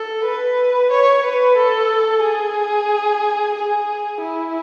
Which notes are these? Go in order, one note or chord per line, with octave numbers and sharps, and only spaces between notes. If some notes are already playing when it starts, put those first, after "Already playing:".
Already playing: A4
B4
C#5
B4
A4
G#4
G#4
E4